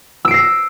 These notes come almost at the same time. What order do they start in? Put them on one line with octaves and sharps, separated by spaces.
E6 D7 C7 A#6